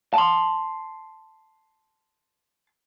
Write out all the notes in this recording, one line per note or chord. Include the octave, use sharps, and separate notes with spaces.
A5 C6